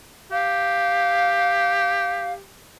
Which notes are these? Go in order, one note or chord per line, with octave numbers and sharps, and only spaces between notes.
G4 F5